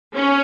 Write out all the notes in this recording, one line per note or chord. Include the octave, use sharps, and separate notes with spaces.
C#4